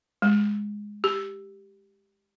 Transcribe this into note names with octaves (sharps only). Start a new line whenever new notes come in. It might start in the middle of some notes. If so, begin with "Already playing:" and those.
G#3
G4